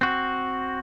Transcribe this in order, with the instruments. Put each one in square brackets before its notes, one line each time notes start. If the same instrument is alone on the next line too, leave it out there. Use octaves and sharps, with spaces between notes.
[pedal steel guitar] C4 F#4